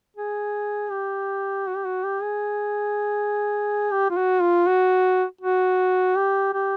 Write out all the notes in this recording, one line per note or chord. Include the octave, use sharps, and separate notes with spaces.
G#4
G4
F#4
G4
F#4
G4
G#4
G4
F4
F#4
F4
F#4
F#4
G4
G4